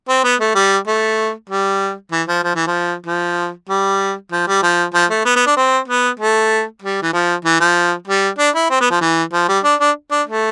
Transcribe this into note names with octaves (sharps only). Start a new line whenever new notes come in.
C4
B3
A3
G3
A3
G3
E3
F3
F3
E3
F3
F3
G3
F3
G3
F3
F3
A3
B3
B3
D4
C4
B3
A3
G3
E3
F3
E3
F3
G3
D4
E4
C4
B3
F3
E3
F3
G3
D4
D4
D4
A3